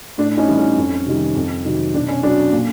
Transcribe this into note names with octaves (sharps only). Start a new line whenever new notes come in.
A2 D4
C#4 D#4
E3 G3
C#4
F2
C3 D#3 G3
F2
C3 D#3 F#3
B2 D4
C#4
F#3 D4
A#2